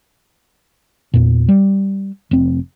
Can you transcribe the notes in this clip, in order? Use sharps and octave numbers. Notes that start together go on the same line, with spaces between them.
E2 A#2
G3
F1 C4